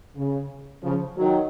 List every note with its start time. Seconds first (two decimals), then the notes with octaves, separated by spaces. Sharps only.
0.17 C#3
0.83 C#3 F3
1.17 D#3 F#3